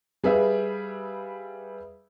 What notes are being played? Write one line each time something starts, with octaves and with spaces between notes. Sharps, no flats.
G3 G#4 B4 E5 F5